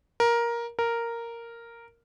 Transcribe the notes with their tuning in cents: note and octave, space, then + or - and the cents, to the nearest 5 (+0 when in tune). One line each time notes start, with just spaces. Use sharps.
A#4 +10
A#4 -5